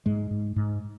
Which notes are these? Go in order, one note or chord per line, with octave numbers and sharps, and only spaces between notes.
G#2 G#3
G#2
G#2